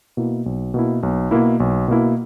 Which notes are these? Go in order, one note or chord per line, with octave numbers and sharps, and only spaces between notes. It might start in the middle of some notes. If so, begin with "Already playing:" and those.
B2 A#3 E4
B1
B2 A#3 E4
B1
B2 A#3 E4
B1
B2 A#3 E4